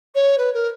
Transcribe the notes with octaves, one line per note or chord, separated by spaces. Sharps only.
C#5
B4
A#4